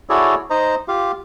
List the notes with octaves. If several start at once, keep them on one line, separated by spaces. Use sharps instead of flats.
E4 F#4 G#4 A4 C#5 D5
D#4 C5 D#5 A#5
F4 G4 F5